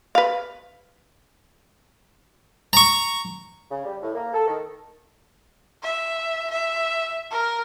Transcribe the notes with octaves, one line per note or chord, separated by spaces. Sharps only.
B4 F5
A#5 C#6
C#3
G3
A2
A#3
A4
D#3
E5
E5
A#4